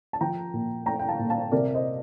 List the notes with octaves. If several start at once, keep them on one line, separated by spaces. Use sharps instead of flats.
A5
F3 G5 A#5
A#2
A3 G5 A#5
G5
F5 A5
A#2
F5 A5
C3 A#4 D5
C5 D#5